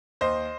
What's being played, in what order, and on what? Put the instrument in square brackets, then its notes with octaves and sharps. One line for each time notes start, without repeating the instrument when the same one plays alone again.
[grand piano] D#2 C5 D#5